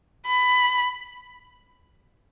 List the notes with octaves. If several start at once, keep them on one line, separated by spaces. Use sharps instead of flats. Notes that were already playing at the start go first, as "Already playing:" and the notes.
B5